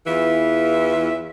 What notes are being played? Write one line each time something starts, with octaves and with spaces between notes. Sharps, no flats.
E2 E3 F4 E5